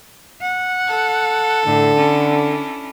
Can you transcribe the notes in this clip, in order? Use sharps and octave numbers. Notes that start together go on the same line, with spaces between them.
F#5
A4
A2 D3
C#4 D4 E4